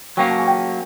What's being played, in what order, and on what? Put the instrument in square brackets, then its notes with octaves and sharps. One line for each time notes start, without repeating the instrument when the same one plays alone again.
[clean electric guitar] F#3 A#3 C#4 [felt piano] G5
[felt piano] A5
G#5
G5